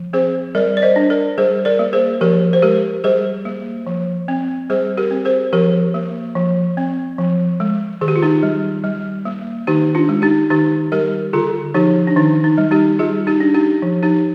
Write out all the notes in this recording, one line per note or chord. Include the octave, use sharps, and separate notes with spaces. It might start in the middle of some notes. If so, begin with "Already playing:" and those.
Already playing: F3
C4 G#4 C5
G3 A#4 D5
D5
C5 D#5
D4
A#4 D5
G3 G#4 C5
A#4 D5
A#3
G#4 C5
F3 G4 A#4
C5
G#3 G4 A#4
G3 G#4 C5
A#3
F3
C4
G3 G#4 C5
G4 A#4
C4
G#4 C5
F3 G4 A#4
A#3
F3
C4
F3
G#3
D#3 G#4
G4
F4
D#4 G4
G3
G3
A#3
D#3 D#4 G4
D4 F4
G#3
D#4 G4
D#3 D#4 G4
G3 G4 A#4
D3 F4 G#4
F3 D#4 G4
D4
D#3 D#4
D#4
G3
D#4 G4
G3 F4 G#4
D#4 G4
D4
D#4 G4
F3
D#4 G4